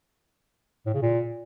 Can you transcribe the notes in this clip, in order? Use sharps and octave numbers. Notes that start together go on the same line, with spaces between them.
A2
C#3
A#2